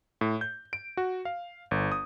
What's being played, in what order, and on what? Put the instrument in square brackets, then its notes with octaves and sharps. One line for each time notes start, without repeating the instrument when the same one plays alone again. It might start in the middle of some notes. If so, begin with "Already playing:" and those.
[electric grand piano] A2
G6
D7
F#4
F5
G1
D#6